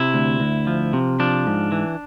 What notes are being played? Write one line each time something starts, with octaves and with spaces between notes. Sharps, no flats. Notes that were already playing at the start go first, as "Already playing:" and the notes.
Already playing: C3 E4
D2
D2
F3
C3
F3 D4
G#2
E3